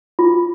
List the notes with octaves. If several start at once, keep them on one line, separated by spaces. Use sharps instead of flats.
F4